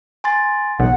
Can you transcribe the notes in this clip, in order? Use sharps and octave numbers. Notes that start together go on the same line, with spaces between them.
G#5 C6 A6
B1 F#5